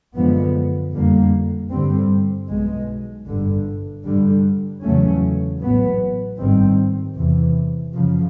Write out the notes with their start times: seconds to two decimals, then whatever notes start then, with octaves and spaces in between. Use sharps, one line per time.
0.15 F#2 D3 F3 G#3 B3
0.93 F2 D3 G3 A#3
1.71 G2 D3 G3 C4
2.49 B1 B2 G#3
3.27 G1 G2 D3
4.05 G2 D3 G3
4.83 E2 C#3 F#3 A3 C#4
5.61 A1 A2 F#3 B3
6.39 G#1 G2 D#3 G3 C4
7.17 E2 C3 E3
7.95 F#2 C#3 F3